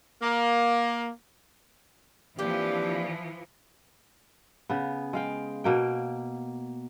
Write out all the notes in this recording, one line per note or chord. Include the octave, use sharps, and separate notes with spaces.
A#3
E3 F3 A#3 C4 D4 G4
C#3 B3
G#3 F5 G5
B2 A#3 G5